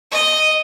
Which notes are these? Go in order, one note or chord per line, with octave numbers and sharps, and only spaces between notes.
D#5